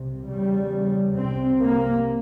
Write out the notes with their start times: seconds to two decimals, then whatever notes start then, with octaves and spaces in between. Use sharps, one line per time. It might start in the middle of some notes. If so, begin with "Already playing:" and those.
Already playing: C2 C3
0.27 E2 C#3 G3
1.16 C2 C3 C4
1.62 A#3